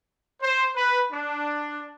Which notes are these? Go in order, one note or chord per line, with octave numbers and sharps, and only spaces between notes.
C5
B4
D4